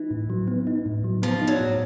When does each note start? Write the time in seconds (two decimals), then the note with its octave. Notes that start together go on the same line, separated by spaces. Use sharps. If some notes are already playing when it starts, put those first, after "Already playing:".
Already playing: E3 D#4
0.11 A2
0.30 F#3
0.48 B3
0.67 D#4
0.86 A2
1.04 F#3
1.22 F3 B3
1.41 D#4
1.47 F#3
1.60 A2